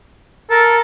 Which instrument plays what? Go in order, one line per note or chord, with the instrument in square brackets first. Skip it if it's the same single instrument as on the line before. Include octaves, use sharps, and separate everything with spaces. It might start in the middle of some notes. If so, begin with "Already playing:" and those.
[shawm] A4 [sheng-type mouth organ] A#4